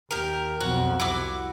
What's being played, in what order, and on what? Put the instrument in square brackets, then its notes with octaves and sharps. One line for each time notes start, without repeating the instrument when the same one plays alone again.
[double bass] D#2 [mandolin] G4 A#4
[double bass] B1 F2 [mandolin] F#4
[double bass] C2 [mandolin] E4 F#4 D6